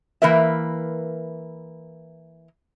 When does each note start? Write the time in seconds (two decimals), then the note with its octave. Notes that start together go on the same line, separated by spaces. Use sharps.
0.22 E3 A#3 A#4 B4 E5